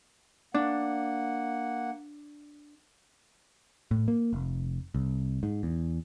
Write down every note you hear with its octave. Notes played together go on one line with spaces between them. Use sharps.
A#3 D4 F#5
A2
A#3
F1
C2
G#2
E2